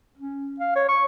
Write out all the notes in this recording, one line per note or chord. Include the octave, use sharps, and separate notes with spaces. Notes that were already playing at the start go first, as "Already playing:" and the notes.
C#4
F5
C#5
C#6